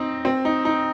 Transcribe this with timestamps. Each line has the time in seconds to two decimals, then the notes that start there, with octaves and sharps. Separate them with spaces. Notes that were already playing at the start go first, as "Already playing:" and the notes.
Already playing: C4 D#4
0.25 C4
0.45 D#4
0.65 D#4